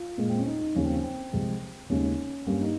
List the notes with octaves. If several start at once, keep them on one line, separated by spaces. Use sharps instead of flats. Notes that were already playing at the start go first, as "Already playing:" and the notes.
Already playing: F4
A#2 G#3
C4
C#4
D#4
D#4
D#2 C#3 F3 C#4
C4
C#4
C4
C2 C3 F3 G#3
D#2 C#3 G#3 C#4
G2 G3 A#3 C#4
D#4